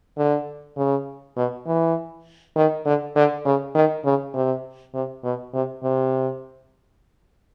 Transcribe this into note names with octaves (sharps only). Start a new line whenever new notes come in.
D3
C#3
B2
E3
D#3
D3
D3
C#3
D#3
C#3
C3
C3
B2
C3
C3